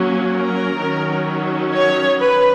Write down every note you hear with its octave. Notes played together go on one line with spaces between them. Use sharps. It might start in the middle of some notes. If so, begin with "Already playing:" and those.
Already playing: F#3 A#3 C#4
A#4
D#3 F#3 C#4
C#5
B4